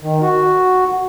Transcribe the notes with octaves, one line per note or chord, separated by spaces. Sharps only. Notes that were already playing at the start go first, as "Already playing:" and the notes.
D#3
F#4